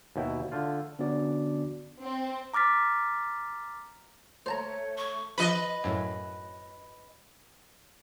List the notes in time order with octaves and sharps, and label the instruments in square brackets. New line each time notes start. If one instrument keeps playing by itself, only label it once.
[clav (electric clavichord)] D#2 B2 E4 G5
D3 A3 F4
[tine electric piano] D3 B3 C#4 D4 F#4 D5
[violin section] C4
[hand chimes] A#5 D6 F6 A6 B6
[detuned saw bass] A3 [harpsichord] C5 A5 A#5 [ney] C#5
[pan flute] C#6
[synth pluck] F3 B5 [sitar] B4 D#5
[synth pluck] F#2 A2